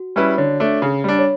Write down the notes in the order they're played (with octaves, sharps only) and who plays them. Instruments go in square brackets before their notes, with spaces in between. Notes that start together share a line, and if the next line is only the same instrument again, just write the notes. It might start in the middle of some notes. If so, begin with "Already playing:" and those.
Already playing: [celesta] F#4
[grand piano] G3 C#4 E4 B4
[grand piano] D3 [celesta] C#5
[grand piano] A3 D4
C#3
G3 D4
[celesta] C#5